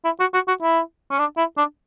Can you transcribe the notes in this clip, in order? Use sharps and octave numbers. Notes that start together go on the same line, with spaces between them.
E4
F#4
F#4
F#4
E4
C#4
D4
E4
D4